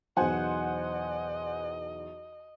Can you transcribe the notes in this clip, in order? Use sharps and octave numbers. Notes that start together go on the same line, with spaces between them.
B1 E2 C5 D#5 F#5 G#5